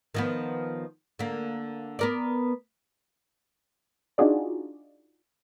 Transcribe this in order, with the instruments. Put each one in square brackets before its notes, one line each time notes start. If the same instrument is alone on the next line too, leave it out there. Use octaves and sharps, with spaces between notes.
[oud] D#3 F3 B3
D3 A#3
B3 A#4 D5
[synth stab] D4 D#4 F4 F#4 G#4 D5